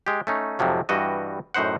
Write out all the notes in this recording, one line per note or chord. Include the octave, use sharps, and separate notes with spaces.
G#3 G4
A3 C#4 D#4
F2 G#2 C3 F3 F#3
G2 E3 G3 F#4 D#5
F#2 A2 D#4 C5 F#5